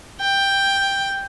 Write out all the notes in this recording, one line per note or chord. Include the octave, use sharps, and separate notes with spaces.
G5